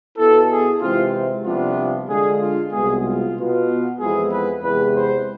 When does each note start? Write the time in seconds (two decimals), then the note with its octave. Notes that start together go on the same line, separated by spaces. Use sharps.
0.18 B2 B3 E4 A4
0.50 G#4
0.81 C3 E3 G#3 C4 E4 F4
1.45 C2 C3 F3 B3 D4 F4
2.08 D3 G#3 D4 F4 G#4
2.41 F4
2.72 C2 B2 G#3 B3 G#4
3.04 F4
3.36 B2 B3 F4
3.99 F2 E3 G#3 B3 E4 G#4
4.32 B4
4.62 E2 C3 G#3 B4
4.95 C5